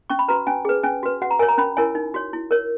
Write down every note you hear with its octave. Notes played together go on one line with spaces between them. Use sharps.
C#4 C#6
B5
F#4 B4 A#5
C#4 G#5
G#4 B4
C#4 G#5
F#4 B4
F#4 F#5
A#5
A#4 C#5 G#5
A#5
C#4 B5
E4 A#4 C#5 G#5
D#4
F#4 C#5
E4
A#4 C#5